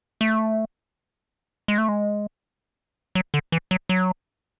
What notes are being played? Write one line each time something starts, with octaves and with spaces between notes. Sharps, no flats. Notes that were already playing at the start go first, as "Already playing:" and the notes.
A3
G#3
A3
G#3
F#3
D3
E3
F#3
F#3